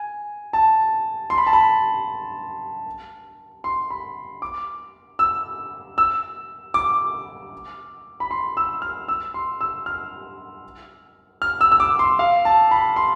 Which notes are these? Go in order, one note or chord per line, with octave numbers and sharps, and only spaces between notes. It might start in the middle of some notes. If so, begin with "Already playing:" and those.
Already playing: G#5
A5
C6
B5
A5
B5
C6
B5
D6
E6
E6
D6
B5
C6
E6
F6
E6
C6
E6
F6
F6
E6
E6
D6
C6
F5
A5
B5
C6